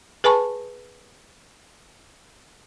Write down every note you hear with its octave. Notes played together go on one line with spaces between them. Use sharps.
G#4 B4 G#5 A5 B5 C#6